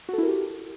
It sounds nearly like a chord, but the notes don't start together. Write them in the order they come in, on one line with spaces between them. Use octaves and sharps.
F#4 A4 E4 A#4 G4